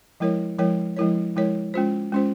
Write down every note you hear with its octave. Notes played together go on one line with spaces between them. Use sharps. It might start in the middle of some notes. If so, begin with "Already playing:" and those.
F3 G#3 E4 A#4 C#5
F3 G#3 E4 A#4 C#5
F3 G#3 E4 A#4 C#5
F3 G#3 E4 A#4 C#5
G#3 C#4 F4 C5
G#3 C#4 F4 C5